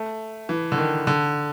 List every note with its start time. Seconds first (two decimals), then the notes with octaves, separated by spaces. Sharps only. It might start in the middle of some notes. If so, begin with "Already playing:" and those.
Already playing: A3
0.49 E3
0.72 D3
0.78 D#3
1.07 D3